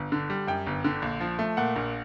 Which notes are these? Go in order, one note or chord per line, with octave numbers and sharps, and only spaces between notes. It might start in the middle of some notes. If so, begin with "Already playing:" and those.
Already playing: G1
D3
G3
F#2 G5
G1
D3
A#1
F3
A3
A#2 F#5
A#1